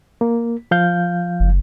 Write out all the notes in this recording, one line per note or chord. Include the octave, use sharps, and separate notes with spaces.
A#3
F3 F5 G6
F#1